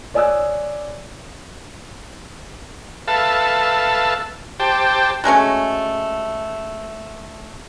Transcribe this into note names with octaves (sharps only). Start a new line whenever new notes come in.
C#5 D5 G#5 D#6 E6 F#6
A4 B4 E5 F5 A5
G4 C5 G5 A5
F#3 G#3 A3 C#4